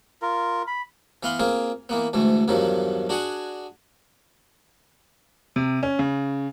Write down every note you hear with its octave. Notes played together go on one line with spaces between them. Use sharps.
F4 A#4
B5
E3 B3 F5 B5 C6
A#3 C4 F4 G#4
E3 A#3 B3
D2 G#2 E3 A3
E2 G2 D#3 F3 F#3
D4 F#4 G#4 F#5 G#5
C3
C#4
C#3